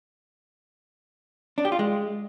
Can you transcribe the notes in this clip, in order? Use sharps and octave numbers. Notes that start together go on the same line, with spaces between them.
D4
G4
F4
G#3